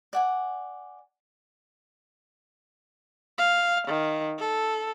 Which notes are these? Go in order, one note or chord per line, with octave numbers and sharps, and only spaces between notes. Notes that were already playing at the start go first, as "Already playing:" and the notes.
D5 F#5 G#5
F5
D#3
A4